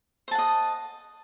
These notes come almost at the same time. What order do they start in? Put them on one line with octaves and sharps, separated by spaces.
C5 A5 F#5 D#5